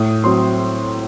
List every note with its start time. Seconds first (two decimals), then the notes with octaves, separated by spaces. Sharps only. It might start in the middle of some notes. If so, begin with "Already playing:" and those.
Already playing: A2 D#6
0.24 F#3 C4 C6